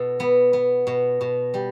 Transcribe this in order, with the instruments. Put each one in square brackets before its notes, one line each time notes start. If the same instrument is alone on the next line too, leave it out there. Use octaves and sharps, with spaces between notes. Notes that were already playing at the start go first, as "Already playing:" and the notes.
Already playing: [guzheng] B2 A4
B3
B3
B2
B2
G3